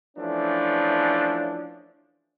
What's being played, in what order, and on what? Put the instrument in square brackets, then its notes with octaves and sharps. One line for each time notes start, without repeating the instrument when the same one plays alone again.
[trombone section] E3 F3 A3 C#4 D4